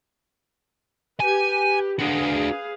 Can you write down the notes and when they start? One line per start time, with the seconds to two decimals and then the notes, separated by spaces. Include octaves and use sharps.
1.20 G4 B4 G#5
1.99 D4 F#4 G#4 B4 F5